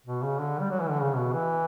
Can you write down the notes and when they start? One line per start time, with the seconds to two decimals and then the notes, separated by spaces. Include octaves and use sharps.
0.06 B2
0.23 C#3
0.38 D3
0.60 G3
0.70 F#3
0.80 E3
0.90 D3
1.01 C#3
1.16 B2
1.33 E3